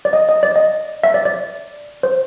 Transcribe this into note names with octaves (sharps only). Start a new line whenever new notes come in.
D5
D#5
D#5
D5
D#5
E5
D5
D5
C5